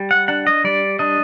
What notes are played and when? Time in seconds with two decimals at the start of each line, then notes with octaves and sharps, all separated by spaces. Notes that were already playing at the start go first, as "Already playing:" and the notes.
Already playing: G3
0.11 F#5
0.28 D4 F#5
0.47 D#5
0.64 G3 D5
0.99 D4 D#5